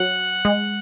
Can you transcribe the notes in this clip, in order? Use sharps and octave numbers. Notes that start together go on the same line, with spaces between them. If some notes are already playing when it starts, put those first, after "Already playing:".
Already playing: F#3 F#5
G#3